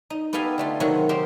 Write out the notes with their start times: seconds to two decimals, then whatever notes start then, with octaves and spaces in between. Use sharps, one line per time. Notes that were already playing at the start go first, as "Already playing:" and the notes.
0.10 D#4
0.33 B3 G4 A4 F5 G5 G#5
0.58 D3 A3 F4
0.80 C3 D#3 F#3 G#3 F#4
1.09 D#4 G4 A#4 C5